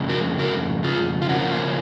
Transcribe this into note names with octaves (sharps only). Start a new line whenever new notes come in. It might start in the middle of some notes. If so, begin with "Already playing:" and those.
Already playing: F2 C#3 G#3
F#4 A#4
F#4 A#4
F4 G#4
F4
C#3 F3 A#3 C#4 F#4
F4